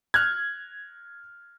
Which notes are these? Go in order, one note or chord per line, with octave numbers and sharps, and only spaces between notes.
F6 F#6 G#6